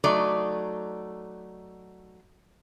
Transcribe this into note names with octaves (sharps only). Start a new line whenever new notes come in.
F#3 A3 D#4 D5